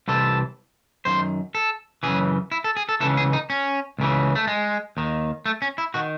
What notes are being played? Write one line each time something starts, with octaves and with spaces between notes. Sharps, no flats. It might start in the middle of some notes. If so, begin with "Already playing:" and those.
C2 C3 E3 A4
F#2 D#3 C5
A4
F#2 C#3 E3 G#4
E4
A4
G#4
A4
C#2 C#3 E3 A4
G#4
D#4
C#4
C#2 C#3 E3
A3
G#3
D#2 D#3
A3
C#4
E4
D#3 F#4